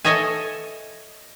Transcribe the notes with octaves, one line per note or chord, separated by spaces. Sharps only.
A4 C#5 D#5 E5 G#5